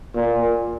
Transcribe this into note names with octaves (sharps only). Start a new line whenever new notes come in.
A#2